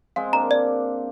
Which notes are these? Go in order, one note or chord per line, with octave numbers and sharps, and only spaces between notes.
G#3 C4 F5
A#3 D4 A#5
D5